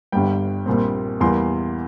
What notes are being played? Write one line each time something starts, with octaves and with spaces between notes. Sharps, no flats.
G1 G2 G3 G5
A#1 A#2 G3 C4
E2 E3 G3 A#3 C6